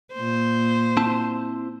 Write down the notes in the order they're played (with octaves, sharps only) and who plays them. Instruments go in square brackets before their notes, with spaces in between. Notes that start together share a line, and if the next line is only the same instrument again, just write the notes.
[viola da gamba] A#2 C5
[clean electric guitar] C4 E4 A5